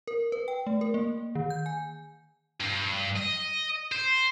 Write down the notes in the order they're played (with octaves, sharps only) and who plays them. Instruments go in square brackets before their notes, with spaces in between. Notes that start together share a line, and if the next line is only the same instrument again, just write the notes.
[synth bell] A#4
B4
G5
A3
A#4
A#3
D#3
G6
G#5
[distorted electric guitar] G2
D#5
C5